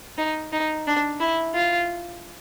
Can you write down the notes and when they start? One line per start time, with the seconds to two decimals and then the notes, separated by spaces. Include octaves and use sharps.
0.18 D#4
0.53 D#4
0.87 D4
1.20 E4
1.55 F4